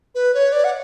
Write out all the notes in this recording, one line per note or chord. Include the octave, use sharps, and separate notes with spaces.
B4
C#5
D5
F#5